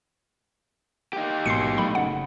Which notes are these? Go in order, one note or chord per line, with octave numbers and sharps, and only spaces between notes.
D#4 G4
A1 G#2 B2 C6 C7 C#7
A#1 F#3 A3 B5
F#1 C#3 F#5